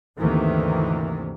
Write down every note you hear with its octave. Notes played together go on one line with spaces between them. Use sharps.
D2 G2 C3 D#3 E3 A#3